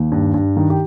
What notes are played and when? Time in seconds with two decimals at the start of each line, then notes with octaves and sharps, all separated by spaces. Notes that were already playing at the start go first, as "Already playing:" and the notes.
Already playing: D#2
0.12 G2
0.34 G2
0.57 D#3
0.70 G4